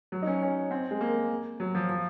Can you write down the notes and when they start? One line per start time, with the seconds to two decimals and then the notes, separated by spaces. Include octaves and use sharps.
0.12 F#3
0.22 D#4
0.27 C#4
0.42 C#4
0.71 C4
0.91 G#3
1.01 A#3
1.60 F#3
1.75 F3
1.89 F3